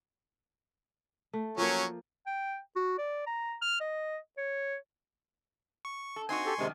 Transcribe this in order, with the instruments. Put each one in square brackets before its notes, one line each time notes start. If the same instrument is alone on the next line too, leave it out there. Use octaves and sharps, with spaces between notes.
[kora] A3
[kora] F3 A#3 [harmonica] F#3 C#4
[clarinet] G5
F#4
D5
A#5
F6
D#5
C#5
[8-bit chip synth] C#6
[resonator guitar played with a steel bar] A4
[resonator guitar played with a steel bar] C4 D#4 F#4 [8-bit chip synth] G#5 C6 C#6
[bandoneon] G4 A4
[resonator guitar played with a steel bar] F#2 D#3 D4 [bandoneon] C3 G#3